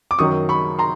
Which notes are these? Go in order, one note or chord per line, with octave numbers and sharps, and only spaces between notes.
D6
F#2 D#3 F#3 C#6 D#6
B5 C#6
A#5 C6